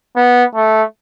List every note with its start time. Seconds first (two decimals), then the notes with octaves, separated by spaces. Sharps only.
0.16 B3
0.55 A3